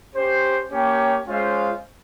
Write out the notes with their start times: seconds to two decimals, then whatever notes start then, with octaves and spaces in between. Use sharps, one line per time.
0.15 C#4 G4 C5
0.71 A#3 C#4 G4 C#5 G5
1.26 G#3 C#4 F4 C5 F5